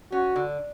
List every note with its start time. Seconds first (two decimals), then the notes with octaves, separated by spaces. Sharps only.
0.12 C#4 F#4
0.36 D3